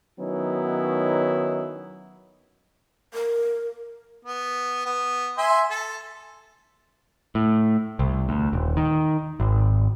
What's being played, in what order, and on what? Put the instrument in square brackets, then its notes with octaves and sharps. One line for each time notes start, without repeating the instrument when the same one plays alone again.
[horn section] D#3 F#3 B3 C#4 D#4 E4
[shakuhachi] A#4
[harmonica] B3
B3
E5 G#5 C6
A4 A5
[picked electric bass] A2
C2
D2
D#1
D#3
G#1